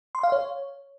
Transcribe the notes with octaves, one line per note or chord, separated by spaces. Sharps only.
C6
F5
C#5